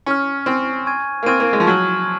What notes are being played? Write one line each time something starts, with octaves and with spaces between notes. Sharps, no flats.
C#4 G#5 C#6 F6
C4 G#5 C#6 F6
G#5 C#6 F6 G#6 D#7
A#3
C4 G#5 C#6 F6 G#6 D#7
A#3
G#3
F3
F#3 C#6 F6 G#6 D#7 F#7